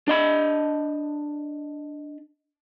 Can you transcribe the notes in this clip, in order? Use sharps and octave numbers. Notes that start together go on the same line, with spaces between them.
D4 D#5 B5